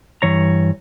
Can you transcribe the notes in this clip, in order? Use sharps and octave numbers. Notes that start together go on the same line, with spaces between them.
G2 E3 C#5 A#5